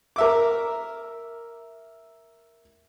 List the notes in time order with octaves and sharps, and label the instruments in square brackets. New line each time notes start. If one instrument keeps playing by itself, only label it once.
[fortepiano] A#4 E5 D6